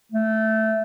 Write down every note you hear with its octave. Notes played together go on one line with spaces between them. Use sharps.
A3